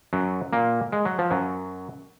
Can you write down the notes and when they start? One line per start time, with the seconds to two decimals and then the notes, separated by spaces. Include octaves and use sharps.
0.13 F#2 F#3
0.53 A#2 A#3
0.92 G#3
1.05 F#3
1.19 F3
1.31 F#2 F#3